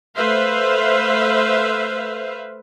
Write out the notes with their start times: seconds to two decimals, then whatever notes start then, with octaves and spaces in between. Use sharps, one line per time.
0.17 A3 B4 C5 E5 F5